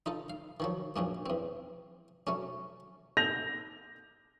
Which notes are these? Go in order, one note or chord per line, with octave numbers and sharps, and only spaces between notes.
D#4 F4 A4
F5
D#3 F3 F#3
A#1 F#2 A#2 A#3
E2 C4
F#3 A3 C#4
G6 A#6 F7